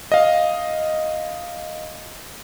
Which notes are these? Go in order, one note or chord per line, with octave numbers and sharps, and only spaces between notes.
D#5 F5